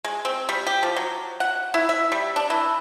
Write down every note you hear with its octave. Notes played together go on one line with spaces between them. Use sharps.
G#3
C4
G3
G4
F3
F#3
F#5
E4
E5
G3
D4
E3